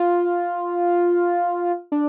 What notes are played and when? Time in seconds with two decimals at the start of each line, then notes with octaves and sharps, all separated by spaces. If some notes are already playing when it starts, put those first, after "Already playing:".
Already playing: F4
1.92 D4